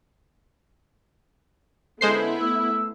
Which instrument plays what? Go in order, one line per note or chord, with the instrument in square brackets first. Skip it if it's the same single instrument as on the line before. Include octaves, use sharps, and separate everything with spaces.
[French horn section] D3 C#4 A4 [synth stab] G#3 C5 C7 [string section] B3 E4
[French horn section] A3 [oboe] E6